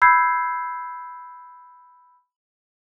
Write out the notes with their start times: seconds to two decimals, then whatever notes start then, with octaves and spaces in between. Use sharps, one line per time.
0.02 B5 E6 G6 G#6 C7